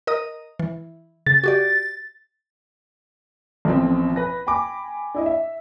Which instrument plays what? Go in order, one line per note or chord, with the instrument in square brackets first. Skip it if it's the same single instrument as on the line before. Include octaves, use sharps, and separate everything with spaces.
[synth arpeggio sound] A#4 D#5 D#6
E3
[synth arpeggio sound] C#3 [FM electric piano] A6
[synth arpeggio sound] F#4 G4 D5
[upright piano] A1 B2 F3 C4
B4 A#6
G5 G#5 B5 D6
D4 E4 D#5
E5